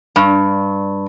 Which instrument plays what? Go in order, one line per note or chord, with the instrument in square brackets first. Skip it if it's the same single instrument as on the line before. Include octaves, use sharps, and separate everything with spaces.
[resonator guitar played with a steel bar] G2